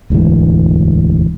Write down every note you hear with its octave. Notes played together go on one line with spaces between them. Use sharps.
E1 D2 G#2 E3